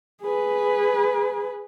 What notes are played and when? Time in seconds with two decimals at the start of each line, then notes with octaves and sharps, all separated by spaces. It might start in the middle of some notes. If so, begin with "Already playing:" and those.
0.22 G#4 B4